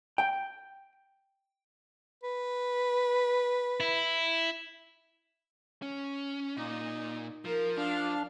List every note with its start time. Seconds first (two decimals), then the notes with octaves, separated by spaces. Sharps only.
0.18 G5
2.23 B4
3.80 E4
5.82 C#4
6.57 A#2 D#4
7.45 F3 A#4
7.78 D4 F5